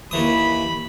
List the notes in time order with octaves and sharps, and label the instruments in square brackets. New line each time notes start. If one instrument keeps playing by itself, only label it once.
[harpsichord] D#2 E3 D#6 [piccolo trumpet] B5